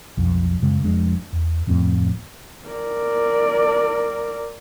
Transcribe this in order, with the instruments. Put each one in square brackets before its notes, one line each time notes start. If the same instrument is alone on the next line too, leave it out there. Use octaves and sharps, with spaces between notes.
[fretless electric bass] B1 F2
F#2 C#3 G#3
F1 F2 G#3 D4
E2
D1 F2 A2 C4
[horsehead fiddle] A#4 D5